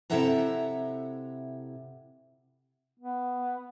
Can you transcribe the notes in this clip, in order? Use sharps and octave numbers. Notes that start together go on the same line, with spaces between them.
C3 E4 A4 E5 F#5 A#5
B3